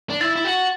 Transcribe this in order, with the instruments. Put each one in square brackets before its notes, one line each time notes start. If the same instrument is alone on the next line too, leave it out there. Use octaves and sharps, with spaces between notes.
[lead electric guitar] D4
[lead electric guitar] E4 [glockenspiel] A6
[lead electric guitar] E4
F#4